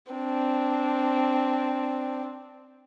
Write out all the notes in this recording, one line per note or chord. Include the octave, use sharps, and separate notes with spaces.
C4 D4